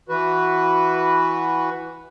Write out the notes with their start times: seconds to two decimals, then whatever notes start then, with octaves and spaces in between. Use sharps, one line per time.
0.09 E3 F#4 B4